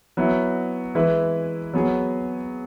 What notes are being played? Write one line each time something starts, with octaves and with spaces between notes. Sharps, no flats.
F#3 B3 E4
E3 G#3 E4 B4
F#3 B3 G#4